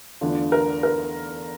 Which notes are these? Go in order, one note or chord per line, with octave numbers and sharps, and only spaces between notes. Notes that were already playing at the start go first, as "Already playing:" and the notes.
E2 D3 A3 D4 F4
A#4
A#4